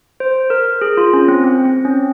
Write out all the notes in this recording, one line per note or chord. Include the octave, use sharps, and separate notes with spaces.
C5
A#4
G#4
F4
C#4
C4
C4
C4
C#4